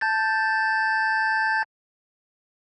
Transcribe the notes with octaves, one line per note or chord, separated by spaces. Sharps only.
A5 G6 A6